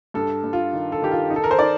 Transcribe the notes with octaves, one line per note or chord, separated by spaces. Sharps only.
G2 A4
G2
F4
D#3
A4
D#3 G4
F4
D#4
A4
A#4
C5
D#4 D5